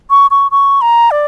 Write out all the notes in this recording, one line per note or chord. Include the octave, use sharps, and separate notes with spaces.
C#6
C#6
C#6
A#5
D5